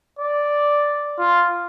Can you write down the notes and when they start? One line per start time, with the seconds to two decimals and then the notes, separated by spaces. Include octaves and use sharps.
0.19 D5
1.18 F4